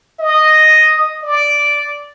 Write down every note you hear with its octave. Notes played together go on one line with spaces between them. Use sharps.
D#5
D5